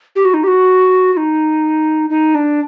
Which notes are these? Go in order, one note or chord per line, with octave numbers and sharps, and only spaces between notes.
G4
F#4
D#4
G4
F#4
F#4
D#4
D#4
D4